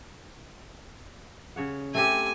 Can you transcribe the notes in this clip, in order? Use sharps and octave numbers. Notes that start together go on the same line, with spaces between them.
C#3 C#5 F#5
A3 C4 G4 G#5